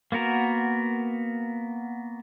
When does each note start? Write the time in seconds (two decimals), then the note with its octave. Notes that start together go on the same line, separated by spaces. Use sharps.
0.12 A#3 B3 F#4 A#4